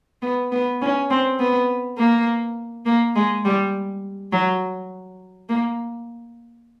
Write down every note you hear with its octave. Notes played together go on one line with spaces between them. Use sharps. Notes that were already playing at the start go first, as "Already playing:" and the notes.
B3
B3
C#4
C4
B3
A#3
A#3
G#3
G3
F#3
A#3